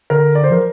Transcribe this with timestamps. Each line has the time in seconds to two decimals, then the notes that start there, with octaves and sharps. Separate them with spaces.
0.10 D3 A#4
0.35 D5
0.43 C5
0.51 F3 A#4